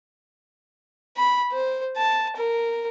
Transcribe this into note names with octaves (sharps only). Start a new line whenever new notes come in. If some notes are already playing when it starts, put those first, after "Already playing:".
B5
C5
A5
A#4